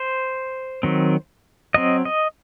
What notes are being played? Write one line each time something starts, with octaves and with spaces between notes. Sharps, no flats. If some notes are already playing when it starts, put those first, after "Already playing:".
Already playing: C5
D#3 F#3 C4
F#3 C4 D#5
D#5